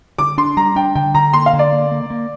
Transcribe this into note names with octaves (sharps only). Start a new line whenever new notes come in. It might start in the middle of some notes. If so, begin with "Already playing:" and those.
D3 D6
D4 C6
G3 A#5
D4 G5
D3 G5
D3 A#5
A#3 C6
F5
D3
D5
A#3
A#3
A#3